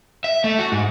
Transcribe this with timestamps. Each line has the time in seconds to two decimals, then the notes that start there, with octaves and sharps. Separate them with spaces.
0.24 E5
0.44 A3
0.59 F#4
0.72 G#2